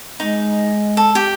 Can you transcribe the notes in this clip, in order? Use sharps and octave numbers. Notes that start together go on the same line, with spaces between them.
G#3 D#4
A4
G4